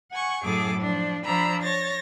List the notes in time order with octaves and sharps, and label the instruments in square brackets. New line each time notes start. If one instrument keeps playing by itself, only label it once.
[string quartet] F#5 G#5 C#6
F#2 A2 F#3 G#4 A4 D6
F3 D4
F3 D4 A#5 B5 E6
C#5 A6 A#6